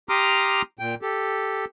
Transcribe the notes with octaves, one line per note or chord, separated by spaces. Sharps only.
G4 A#5 C6 D6 D#6 F6
A#2 G5
G4 A4